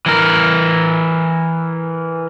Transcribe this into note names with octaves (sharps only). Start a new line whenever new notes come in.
E3 A#4